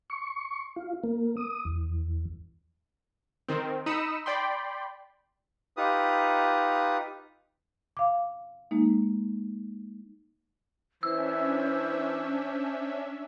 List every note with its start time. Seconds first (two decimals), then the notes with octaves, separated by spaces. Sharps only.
0.10 C#6
0.76 F4
1.04 A#3
1.37 D#6
1.65 E2
3.48 D#3 C4
3.86 D#4 B5 D#6 E6 C#7 E7
4.26 D5 G5 B5 C6
5.77 D#4 F4 G4 B4 D#6
7.97 F5 D6
8.71 G#3 A#3 D#4
11.03 E3 C#4 D4 C5 E5 E6